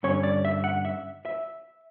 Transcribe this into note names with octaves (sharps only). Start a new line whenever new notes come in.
G2 D3 G3 C#4 C#5
D5
E5
F#5
E5
E5